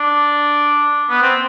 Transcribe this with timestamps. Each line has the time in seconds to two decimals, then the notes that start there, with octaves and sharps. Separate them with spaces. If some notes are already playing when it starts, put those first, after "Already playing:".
Already playing: D4
1.10 B3
1.22 C4